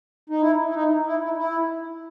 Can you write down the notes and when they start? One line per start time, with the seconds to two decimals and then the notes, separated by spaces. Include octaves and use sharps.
0.30 D#4
0.41 E4
0.70 E4
0.74 D#4
1.06 E4
1.24 E4
1.37 E4